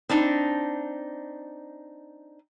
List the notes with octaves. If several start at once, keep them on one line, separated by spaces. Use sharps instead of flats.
C4 D4 D#4